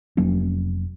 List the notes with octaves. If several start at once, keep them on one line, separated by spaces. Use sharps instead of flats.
F1 F#3 A#3 C#4